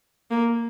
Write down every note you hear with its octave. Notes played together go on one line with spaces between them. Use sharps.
A#3